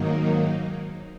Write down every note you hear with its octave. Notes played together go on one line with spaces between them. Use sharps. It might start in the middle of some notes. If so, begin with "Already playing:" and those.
Already playing: G#2 D#3 F#3 A#3 D#4